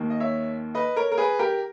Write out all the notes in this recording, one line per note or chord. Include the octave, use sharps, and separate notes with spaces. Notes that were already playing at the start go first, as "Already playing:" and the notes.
Already playing: D#2 D#3 A#3
D#5
C#5 E5
B4 D#5
A#4 C#5
A#4
G#4 B4
G4 A#4